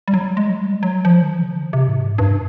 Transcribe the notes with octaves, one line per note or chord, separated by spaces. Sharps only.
G3
F#3
G#3
F#3
G3
F#3
F3
D#3
E3
C#3
D3
C3
A2
G#2
G2